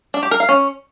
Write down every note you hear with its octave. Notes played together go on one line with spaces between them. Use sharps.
D4
G4
A#4
F5
C#4